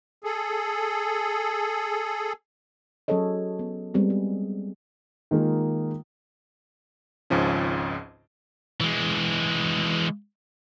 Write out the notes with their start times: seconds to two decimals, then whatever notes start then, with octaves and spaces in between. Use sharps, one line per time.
0.24 G#4 A4
3.08 F#3 C#4 G#4 A4 C#5 D#5
3.59 B3
3.94 G3 G#3 B3 C4
4.10 G#4
5.31 D#3 G#3 A#3 F4
7.30 G#1 C#2 G#2 F3 C#4
8.80 E3 G#3